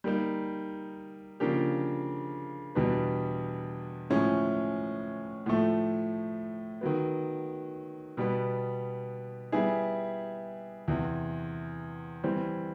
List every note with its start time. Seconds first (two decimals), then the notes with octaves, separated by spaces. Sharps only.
0.04 G3 A#3 D#4
1.40 C#3 F3 A#3 D4 G4
2.75 E2 B2 G3 B3 D4
4.10 A2 F3 G#3 C#4 E4
5.46 A2 F3 A3
6.81 D#3 F#3 B3
8.17 B2 G3 B3
9.52 G3 B3 E4 G#4
10.88 E2 C3 E3
12.24 E3 G3 C4